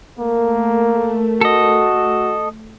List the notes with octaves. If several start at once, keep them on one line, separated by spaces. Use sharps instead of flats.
A3 A#3 A#4
F#4 A4 D#5